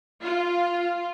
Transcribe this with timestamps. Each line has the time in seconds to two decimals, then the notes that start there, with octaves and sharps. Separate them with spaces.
0.22 F4